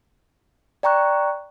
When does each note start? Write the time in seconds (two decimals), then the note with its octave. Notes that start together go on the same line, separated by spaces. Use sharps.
0.83 D5 G5 A#5 C#6 F#6